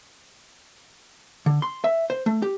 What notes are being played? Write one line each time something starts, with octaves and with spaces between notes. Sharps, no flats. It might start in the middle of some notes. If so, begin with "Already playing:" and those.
D3
C6
E5
C5
A3
G4